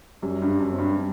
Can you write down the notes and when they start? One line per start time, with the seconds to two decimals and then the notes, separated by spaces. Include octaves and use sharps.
0.22 F#2 G3
0.42 G2
0.48 G3
0.60 F#2
0.73 C4
0.78 G2
0.97 G3